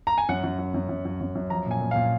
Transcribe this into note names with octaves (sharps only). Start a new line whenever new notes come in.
A#5
G#5
F#2 F#5
F#2
F#2
F#2
F#2
F#2
F#2
F#2
F3 A#5
A#2 G#5
A#2
A#2 F5